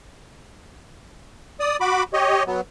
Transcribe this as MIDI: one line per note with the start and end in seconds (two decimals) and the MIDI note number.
1.60 1.77 74
1.60 1.77 87
1.81 2.03 66
1.81 2.03 83
1.81 2.03 86
2.13 2.43 67
2.13 2.43 73
2.13 2.43 75
2.47 2.61 54
2.47 2.61 59